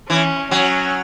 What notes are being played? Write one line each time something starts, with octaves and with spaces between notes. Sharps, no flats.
E3 C#4
F#3 C#4